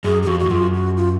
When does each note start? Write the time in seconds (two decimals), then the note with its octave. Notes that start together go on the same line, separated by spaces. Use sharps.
0.04 F#2 G#4
0.22 G#4
0.27 F2 F#4
0.40 F#4
0.46 F2
0.51 F#2 F4
0.74 F#4
0.97 F4